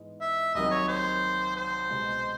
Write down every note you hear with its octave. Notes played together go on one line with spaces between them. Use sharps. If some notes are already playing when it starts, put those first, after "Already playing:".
Already playing: G#2 E3 G#3 B3
E5
C2 C3 D#3 F#3 A#3 D#5
C#5
C5
C5
C2 B2 G#3